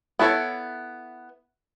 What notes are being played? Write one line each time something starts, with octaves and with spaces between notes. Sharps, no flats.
B3 E4 A4 C#5